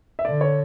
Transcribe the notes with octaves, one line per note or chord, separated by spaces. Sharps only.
E5
D3 D5
C#5